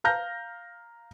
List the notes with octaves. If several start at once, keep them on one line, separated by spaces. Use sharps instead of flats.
F5 A#5 F6 G6 A#6